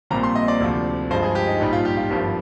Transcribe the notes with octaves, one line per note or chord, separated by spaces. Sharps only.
A#1 A#2 G3 C4 A#5
C6
D#5
D5
D2 C3 F3
G2 F3 G#3 C5
G#4
G4
D#4
A#1 G#2 G3 D#4
F4
G4
F4
G#1 G2 F3 G4